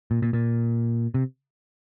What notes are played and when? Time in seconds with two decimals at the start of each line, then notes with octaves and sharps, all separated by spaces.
0.11 A#2
0.22 A#2
0.33 A#2
1.14 C3